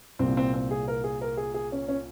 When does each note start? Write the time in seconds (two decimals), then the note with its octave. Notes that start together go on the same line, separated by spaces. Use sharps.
0.19 C2 A#2 C4
0.37 C4
0.54 C4
0.71 G#4
0.88 A#4
1.04 G#4
1.21 A#4
1.37 G#4
1.54 G#4
1.72 C#4
1.88 C#4